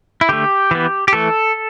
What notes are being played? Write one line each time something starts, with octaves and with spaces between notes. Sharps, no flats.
E4
D3 A3 G4
E3 B3
G4
E3 A3 A4